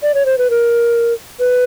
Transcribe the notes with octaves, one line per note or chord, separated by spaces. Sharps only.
D5
C#5
C5
B4
A#4
B4